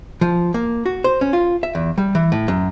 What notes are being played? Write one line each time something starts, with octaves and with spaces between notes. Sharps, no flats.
F3
A#3
F#4
C5
C#4
F4
E5
E2
G3
E3
A2
F#2